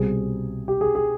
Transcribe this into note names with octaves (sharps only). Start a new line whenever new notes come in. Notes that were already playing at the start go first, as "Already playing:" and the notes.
Already playing: C2 B2 G3 C4 G#4
G4
G#4
G#4